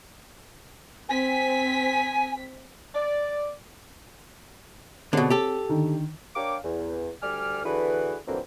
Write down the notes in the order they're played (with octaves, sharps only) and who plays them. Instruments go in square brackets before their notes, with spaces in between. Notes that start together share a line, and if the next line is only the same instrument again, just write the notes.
[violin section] C4 B6 [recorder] G#5
[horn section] D5
[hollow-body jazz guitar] B2 D3 [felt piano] C4 G#4 C#5
[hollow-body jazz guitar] G4 A4
[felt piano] D3 D#3
[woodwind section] D4 A#4 C#5 F5 G5 D6
E2
D2 G3 D5 G#5 D6 F6
D3 E3 D4 F#4 G#4 B4
F2 D3 E3 F#3 A#3 C4